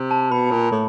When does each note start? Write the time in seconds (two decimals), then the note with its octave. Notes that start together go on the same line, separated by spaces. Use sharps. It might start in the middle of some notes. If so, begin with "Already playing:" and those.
Already playing: C3
0.11 A5
0.31 B2 B5
0.51 A#2
0.71 A2